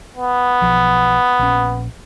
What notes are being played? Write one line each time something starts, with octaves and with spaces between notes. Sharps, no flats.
B3
B1 F3
A#1 C#4